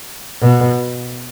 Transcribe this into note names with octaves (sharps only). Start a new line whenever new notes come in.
B2